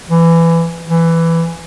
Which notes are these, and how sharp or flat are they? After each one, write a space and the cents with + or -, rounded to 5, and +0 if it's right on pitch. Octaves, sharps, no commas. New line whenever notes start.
E3 +20
E3 +10